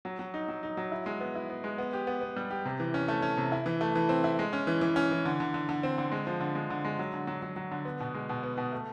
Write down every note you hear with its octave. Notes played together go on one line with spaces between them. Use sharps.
F#3
F#3
D#4
F#3
D#4
F#3
E4
G#3
B3
E4
B3
G#3
B3
G4
B3
B3
G3
G4
C3
E3
C#4
A3
C#4
C3
E4
E3
A3
E3
C4
E4
G#3
C#4
E3
E3
C#4
E3
D3
D3
D3
D3
C4
D3
G#3
F3
D3
G#3
D3
G#3
F#3
D3
F#3
F#3
F#3
D3
B3
B2
G#3
B2
B3
B2
A3